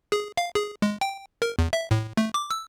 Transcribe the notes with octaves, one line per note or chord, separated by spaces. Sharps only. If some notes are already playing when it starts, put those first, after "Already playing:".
G#4
F5
G#4
G#3
G5
A#4
E2
E5
A2
A3
D6
E6